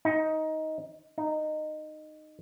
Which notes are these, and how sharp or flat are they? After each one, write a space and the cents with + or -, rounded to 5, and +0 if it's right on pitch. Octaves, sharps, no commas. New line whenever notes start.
D#4 +15
D#4 -15